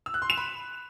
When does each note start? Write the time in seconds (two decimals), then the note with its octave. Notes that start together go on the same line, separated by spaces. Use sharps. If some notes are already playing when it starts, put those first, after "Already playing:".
0.06 E6
0.14 F#6
0.22 C6
0.30 E7
0.38 B5